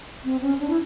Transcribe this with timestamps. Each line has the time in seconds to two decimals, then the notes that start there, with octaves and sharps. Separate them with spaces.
0.25 C4
0.42 C#4
0.60 D4
0.70 E4